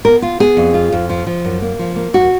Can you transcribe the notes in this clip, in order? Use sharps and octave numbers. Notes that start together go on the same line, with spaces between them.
B3 A#4
F4
B3 G#4
F2
F4
F2
F3
F3
F#2
A#3
F3
A#3
F#2 F#4